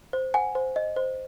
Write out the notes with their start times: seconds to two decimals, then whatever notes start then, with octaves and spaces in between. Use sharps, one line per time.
0.13 C5
0.34 F#5 G#5
0.55 C5
0.76 D#5
0.96 C5